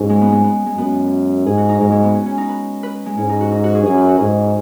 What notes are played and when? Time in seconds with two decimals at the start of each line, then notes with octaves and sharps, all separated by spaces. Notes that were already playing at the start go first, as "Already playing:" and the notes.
Already playing: G#2 C#4 F#4 G#4 B4
0.09 G#3
0.21 B3
0.32 G#3
0.44 B3
0.66 G#3
0.78 F#2 B3
1.46 G#2 G#4
1.58 F#4
1.69 D#4
1.81 G#2 G#3
1.92 G#3
2.04 B3
2.15 C#4
2.26 C#4
2.38 D#4
2.49 B4
2.83 B4
3.06 G#3
3.17 G#2 C#4
3.29 D#4
3.41 F#4
3.52 D#4
3.64 F#4
3.75 G#4
3.86 F#2 G#4
3.98 B4
4.09 F#4
4.20 G#2 G#4